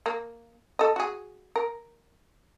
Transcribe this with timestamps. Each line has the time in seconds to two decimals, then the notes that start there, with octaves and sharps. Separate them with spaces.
0.06 A#3
0.79 A4 D#5
0.96 F#4 G#4
1.56 A#4